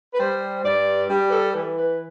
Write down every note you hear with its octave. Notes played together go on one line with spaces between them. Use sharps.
B4
G3 C5
G2 D5
G3 G4
B4
A4
E3 B4
B4